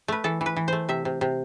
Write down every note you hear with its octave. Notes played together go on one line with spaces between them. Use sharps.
A3 B4
E3 A4
E3
B4
E3
A3 C5
C3 E5
C3
C3